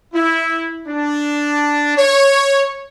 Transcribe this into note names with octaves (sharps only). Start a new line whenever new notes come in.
E4
D4
C#5